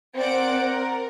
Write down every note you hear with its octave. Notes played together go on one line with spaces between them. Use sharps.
C4 A#4 D5 F#5 D7
A#4